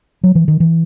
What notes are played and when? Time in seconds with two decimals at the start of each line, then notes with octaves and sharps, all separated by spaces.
0.23 F#3
0.35 E3
0.48 D#3
0.60 E3